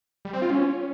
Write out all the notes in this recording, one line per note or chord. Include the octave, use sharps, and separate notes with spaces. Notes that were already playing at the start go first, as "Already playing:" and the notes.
G3
C4
F4
C#4